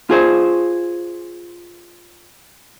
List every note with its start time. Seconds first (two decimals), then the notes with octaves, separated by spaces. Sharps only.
0.10 F4 G#4 C5